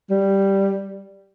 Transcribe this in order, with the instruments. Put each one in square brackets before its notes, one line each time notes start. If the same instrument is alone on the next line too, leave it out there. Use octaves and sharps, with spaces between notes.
[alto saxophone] G3